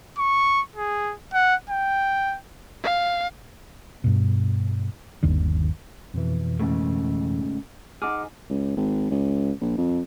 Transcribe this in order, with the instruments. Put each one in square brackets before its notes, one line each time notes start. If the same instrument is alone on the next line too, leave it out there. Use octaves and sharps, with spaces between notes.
[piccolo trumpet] C#6
G#4
F#5
G5
[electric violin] F5
[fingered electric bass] G2 B2
G1 D#2 D#3 D4
[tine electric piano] F2 B2 E3
[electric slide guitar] G#2 C#3 A3
[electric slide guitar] D#4 G#4 [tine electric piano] F#5 D6 F6
[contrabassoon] C#2
G#1
C#2
A#1
F2